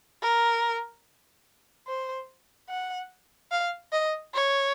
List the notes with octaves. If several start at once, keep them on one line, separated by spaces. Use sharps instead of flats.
A#4
C5
F#5
F5
D#5
C#5